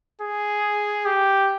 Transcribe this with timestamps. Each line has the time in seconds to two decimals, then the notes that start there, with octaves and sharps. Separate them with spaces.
0.21 G#4
1.06 G4